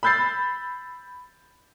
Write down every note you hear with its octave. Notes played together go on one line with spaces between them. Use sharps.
B5 E6 G6 A6 C7